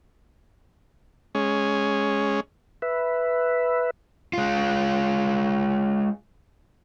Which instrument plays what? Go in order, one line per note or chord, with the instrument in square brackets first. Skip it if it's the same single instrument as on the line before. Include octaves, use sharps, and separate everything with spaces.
[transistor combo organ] G#3 C#4
[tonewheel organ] B4 E5
[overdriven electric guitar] G#3 F4